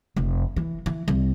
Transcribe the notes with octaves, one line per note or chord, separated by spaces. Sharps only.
F1
E3
E3
C2